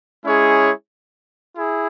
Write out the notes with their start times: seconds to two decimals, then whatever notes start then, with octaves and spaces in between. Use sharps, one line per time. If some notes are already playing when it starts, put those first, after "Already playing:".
0.24 G#3 C#4 E4 G#4 C#5
1.58 E4 G#4